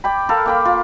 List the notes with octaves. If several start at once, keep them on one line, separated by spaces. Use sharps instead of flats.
D5 G5 B5
A4 A#4 F5 B5
A#3 G5 B5
F4